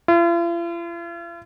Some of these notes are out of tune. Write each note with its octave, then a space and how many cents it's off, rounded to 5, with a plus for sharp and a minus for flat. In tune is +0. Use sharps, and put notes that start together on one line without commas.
F4 -45